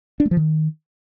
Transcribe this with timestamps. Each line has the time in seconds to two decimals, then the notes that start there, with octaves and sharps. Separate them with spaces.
0.20 D4
0.25 A3
0.31 F3
0.37 D#3